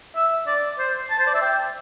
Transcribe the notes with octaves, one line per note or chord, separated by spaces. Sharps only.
E5
D5
C5
A5
C5
D5
E5
G5